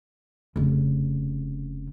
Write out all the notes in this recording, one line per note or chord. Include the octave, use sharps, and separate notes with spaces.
F1 C#3